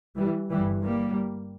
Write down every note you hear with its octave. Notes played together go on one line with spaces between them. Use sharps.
E3 G3
G1 G2 E3 G3
G3 A#3